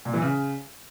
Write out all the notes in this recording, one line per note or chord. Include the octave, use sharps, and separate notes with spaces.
A#2
E3
C#3